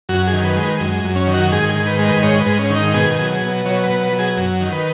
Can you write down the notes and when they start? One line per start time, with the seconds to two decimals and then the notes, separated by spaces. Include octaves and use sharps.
0.09 F#2 F#4
0.27 G#4
0.33 D#3
0.44 B4
0.56 G#3
0.63 B4
0.80 F#2
1.04 F#2
1.16 C#4
1.27 D#3
1.34 F#4
1.52 G#2 G#4
1.69 G#4
1.76 D#3
1.87 B4
1.99 G#3
2.06 B4
2.23 G#2 C#5
2.40 B4
2.46 G#2
2.59 C#4
2.70 D#3
2.76 D#4
2.94 B2 G#4
3.19 F#3
3.42 B2
3.66 F#3 C#5
3.84 B4
3.90 B2
4.01 B4
4.13 F#3
4.19 G#4
4.37 F#2
4.61 D#3
4.72 B4